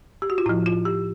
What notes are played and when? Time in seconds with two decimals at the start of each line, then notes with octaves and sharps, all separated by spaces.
0.22 G4
0.30 F#4
0.38 F4
0.46 A2 F3 E4
0.66 F4
0.85 G4